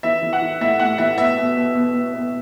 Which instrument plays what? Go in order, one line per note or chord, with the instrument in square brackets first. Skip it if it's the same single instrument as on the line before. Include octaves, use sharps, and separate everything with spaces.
[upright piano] E3 E5
E3
F#5
E3
A2 E5
A2 F#5
E3 E5
B2 E5
B2
B2
B2
B2
B2